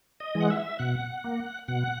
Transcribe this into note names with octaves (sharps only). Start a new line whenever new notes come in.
D#5
E3 G#3
F#5
E5
B2 F#5
A#3
B2 F#5